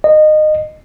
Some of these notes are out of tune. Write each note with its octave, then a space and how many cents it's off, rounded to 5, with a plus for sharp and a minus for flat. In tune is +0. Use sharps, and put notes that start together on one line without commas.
D#5 -20